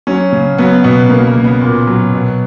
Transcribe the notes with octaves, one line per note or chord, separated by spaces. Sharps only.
F#3 C#4
C#3
F#3 B3
B2 B3
C#3 A#3
A#3
C#3
B3
A#2
F#3
B2